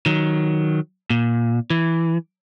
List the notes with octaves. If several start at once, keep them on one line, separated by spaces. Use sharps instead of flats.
D#3 F#3
A#2
E3